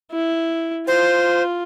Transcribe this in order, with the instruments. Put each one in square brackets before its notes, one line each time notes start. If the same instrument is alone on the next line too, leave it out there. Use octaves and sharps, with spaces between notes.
[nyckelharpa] E4
[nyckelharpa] F4 [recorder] C5